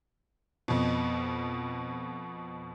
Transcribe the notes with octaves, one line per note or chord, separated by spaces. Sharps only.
F2 B2